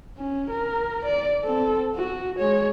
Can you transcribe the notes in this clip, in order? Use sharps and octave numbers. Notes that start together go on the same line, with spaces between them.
C#4
A#4
D5
C4 A4
F#4
G#3 C#5